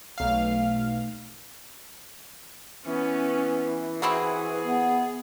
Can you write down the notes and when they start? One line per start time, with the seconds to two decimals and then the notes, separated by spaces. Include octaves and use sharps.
0.18 B1 A3 F5
2.86 E3 B3 C#4
4.02 C4 E4 F#4 G#4
4.62 B3